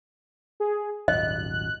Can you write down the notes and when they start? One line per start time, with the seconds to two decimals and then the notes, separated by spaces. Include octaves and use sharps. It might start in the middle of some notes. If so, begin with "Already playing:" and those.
0.60 G#4
1.08 D#1 G#1 F#2 D#5 F#6